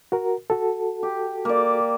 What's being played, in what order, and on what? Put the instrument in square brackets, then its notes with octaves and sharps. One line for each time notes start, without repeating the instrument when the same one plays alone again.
[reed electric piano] F#4 A#4
F#4 A4
[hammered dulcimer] G4
A#3 D5